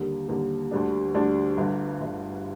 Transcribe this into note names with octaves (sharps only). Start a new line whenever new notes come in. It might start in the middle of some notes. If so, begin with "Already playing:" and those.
Already playing: D#2 D3 G3 A#3
D#2 D3 G3 A#3
D2 D3 G3 D4
D2 D3 G3 D4
G1 G2 D3
G1 G2 D3